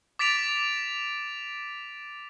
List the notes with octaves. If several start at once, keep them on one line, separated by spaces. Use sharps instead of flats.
D6 A6 B6 D7 F7